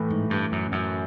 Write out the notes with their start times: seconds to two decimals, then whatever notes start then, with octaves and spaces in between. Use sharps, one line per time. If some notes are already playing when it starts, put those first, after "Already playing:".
Already playing: A2 E3 A3
0.10 G#2
0.30 G2
0.52 F#2
0.72 F#2